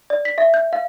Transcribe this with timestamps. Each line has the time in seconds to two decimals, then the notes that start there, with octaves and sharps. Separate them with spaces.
0.10 D5
0.25 B6
0.38 E5
0.54 G6
0.73 F5